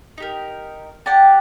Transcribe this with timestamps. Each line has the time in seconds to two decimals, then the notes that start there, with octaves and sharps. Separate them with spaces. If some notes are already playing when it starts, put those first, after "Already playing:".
0.18 D#4 G4 A#4
1.06 G4 D5 F#5 A5